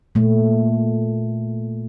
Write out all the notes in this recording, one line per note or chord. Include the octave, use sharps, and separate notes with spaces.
A#2 A3